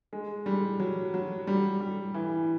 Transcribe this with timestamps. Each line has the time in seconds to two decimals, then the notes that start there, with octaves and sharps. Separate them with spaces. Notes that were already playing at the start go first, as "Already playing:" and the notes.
0.13 G#3
0.46 G3
0.80 F#3
1.14 F#3
1.47 G3
1.80 G3
2.14 E3